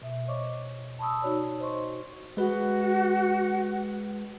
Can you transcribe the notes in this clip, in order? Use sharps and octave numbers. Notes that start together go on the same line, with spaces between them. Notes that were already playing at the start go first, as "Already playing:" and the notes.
B2 E5
C5 C#5 D#5 C#6 D6
A5 B5 C#6 D#6 E6
D#4 F#4 C#5 D5
C5 D#5 C6 C#6
G#3 F#4 B4